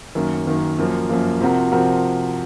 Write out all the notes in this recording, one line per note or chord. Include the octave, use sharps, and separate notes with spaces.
F#2 D#3 A#3
F#2 D#3 A#3
F#2 F3 A#3
F#2 F3 A#3
C3 F3 C4 F#4 A#4
C3 F3 C4 F#4 A#4